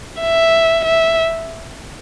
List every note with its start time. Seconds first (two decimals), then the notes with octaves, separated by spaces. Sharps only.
0.21 E5
0.85 E5